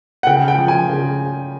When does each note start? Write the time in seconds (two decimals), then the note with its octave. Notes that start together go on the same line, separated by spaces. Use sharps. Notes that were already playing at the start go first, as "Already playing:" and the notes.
0.23 F#5
0.27 C#3 G5
0.48 G5
0.58 F3
0.68 G#5
0.90 C#3